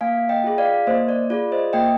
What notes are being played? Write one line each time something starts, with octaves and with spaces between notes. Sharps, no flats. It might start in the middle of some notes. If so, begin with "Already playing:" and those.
A#3 F5 G#5
D#5 G5
F4 G#4
D5 F5
A#3 C5 D#5
D5
F4 G#4 D5
C5 D#5
A#3 D#5 G5